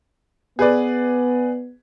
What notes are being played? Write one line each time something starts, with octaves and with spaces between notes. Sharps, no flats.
B3 G#4 B4 D5